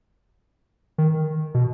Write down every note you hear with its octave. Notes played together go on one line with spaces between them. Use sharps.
D#3
B2